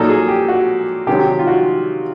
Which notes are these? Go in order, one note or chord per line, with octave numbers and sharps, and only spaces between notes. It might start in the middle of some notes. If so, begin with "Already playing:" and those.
Already playing: A#2 F#3 A#3 D#4 A4
G#4
G4
F#4
C3 D#3 F#3 G4
G4
F4
F#4